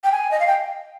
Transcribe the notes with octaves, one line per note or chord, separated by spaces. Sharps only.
G5
G#5
D#5
F5
G5